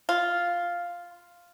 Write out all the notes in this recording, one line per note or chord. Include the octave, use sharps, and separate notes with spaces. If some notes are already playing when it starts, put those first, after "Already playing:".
F4